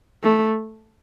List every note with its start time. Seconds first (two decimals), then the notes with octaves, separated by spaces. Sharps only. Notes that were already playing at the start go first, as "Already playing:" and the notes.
0.23 A3